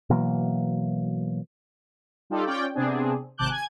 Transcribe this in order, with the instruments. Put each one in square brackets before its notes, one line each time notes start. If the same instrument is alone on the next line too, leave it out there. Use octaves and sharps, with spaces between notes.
[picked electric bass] B2 E3 F#3 A#3
[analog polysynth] G3 D#4 F4 G4 A4 D5
C#4 F4 C#5 D5 G5
C3 B3 C4 D4 G#4
G#1 C3 A5 D6 F#6 G6
G#5 G#6